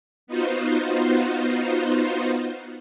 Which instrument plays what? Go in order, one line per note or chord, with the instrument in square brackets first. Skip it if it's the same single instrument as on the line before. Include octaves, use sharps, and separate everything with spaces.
[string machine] B3 D#4 F4 F#4 C5